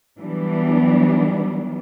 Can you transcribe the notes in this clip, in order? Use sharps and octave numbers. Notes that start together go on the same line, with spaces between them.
E3 F#3 G3 B3 D4